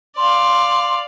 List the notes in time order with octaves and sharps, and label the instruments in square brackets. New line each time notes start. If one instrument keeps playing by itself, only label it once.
[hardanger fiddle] D5 F5 [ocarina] C6